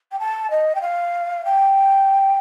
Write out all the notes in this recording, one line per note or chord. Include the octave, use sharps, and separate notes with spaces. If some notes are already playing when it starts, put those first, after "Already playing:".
G5
A5
D#5
G5
F5
G5